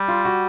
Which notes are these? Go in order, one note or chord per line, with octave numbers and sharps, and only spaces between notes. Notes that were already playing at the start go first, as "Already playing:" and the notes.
Already playing: G3
F4
F#4